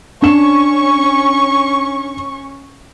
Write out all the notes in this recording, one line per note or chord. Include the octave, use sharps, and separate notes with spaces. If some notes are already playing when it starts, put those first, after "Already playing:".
C#4 D4 C#6 E7